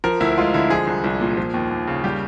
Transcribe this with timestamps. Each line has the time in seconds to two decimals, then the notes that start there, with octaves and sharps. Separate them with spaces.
0.04 F3 A#4
0.20 D2 E4
0.37 G#3 F4
0.54 D3 E4
0.70 F3 G#4
0.87 C2
1.04 C2
1.21 A#2
1.37 F3
1.54 D#2
1.71 D#2
1.87 C#3
2.04 G3 G4